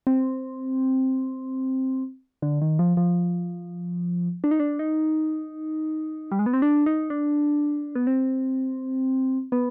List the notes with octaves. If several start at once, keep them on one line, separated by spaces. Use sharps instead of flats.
C4
D3
D#3
F3
F3
D4
D#4
D4
D#4
G3
G#3
B3
C4
D4
D#4
D4
B3
C4
B3